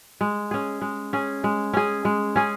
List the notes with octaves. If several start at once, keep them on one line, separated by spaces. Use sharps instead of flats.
G#3
C#4 G#4
G#3
C#4 G#4
G#3
C#4 G#4
G#3
C#4 G#4